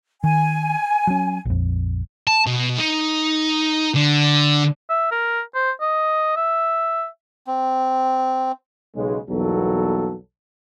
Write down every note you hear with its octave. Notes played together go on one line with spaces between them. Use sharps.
D#3 G#5
F#3 C#4
A#1 F2
A5
B2
D#4
D3
E5
A#4
C5
D#5
E5
C4
B1 C#3 G#3
B1 E2 F#3 G3 A#3 A4